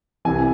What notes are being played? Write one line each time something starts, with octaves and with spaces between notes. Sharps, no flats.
C2 C3 E3 G#5